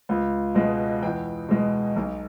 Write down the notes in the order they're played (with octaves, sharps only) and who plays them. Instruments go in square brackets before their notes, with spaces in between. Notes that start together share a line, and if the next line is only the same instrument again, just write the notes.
[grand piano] C#2
B2 G#3
E2 G5
B2 G#3
B1